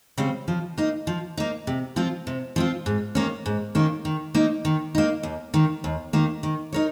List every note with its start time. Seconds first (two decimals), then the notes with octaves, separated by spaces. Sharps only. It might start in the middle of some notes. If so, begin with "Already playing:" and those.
0.18 C#3 G3 C4
0.48 F3
0.78 A#3 D#4
1.07 F3
1.37 A#3 D#4
1.67 C3
1.96 F3 C4 F4
2.27 C3
2.56 F3 C4 F4
2.86 G#2
3.15 D#3 A#3 C#4
3.46 G#2
3.75 D#3 A#3 C#4
4.05 D#3
4.34 A#3 D#4
4.65 D#3
4.95 A#3 D#4
5.23 D#2
5.54 D#3 A#3
5.84 D#2
6.13 D#3 A#3
6.43 D#3
6.73 D#4 A#4 C#5